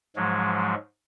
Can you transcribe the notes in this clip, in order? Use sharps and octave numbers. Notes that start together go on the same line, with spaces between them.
G#2 F3 F#3 G#3